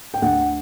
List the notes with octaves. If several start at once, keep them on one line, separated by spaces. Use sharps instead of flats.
G5
D2 F#5